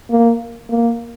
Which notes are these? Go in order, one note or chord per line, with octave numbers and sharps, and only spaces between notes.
A#3
A#3